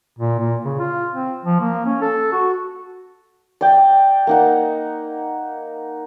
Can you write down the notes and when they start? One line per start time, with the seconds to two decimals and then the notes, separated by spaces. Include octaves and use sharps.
0.19 A#2
0.39 A#2
0.65 C#3
0.79 F4
1.13 C4
1.45 F3
1.60 A#3
1.86 C#4
2.01 A4
2.33 F#4
3.61 D5 G5
4.27 A#3 D#4 F#5